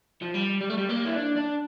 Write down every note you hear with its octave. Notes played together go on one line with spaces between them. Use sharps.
F3
G3
G3
A3
G3
A#3
E4
D4
D4